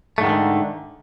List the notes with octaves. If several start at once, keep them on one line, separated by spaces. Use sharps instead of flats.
G#2 D3 D#3 G#3 A3